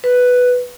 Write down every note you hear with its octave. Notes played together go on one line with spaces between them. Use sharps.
B4